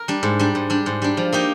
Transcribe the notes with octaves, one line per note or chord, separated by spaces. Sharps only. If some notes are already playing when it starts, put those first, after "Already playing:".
Already playing: A#4
G3 D4
G#2
G3 D4
G#2
G3 D4
G#2
G3 D4
F3
A#3 D#4 G4